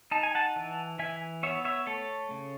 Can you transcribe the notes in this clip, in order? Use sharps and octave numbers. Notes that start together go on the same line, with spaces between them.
D#4 A5
G#5
F#5 A5
E3
E3 E5 G#5
B3 C#5 E5
C#5 E5
A3 A4 C#5
C#3